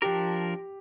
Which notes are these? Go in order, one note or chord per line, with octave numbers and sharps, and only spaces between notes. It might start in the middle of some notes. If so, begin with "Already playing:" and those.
F3 D4 G4 A#4